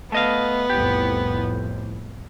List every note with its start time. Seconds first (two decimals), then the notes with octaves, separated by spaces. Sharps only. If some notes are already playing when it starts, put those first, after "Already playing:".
0.12 A3 B3 D#5 F5
0.70 C2 F2 A2 G4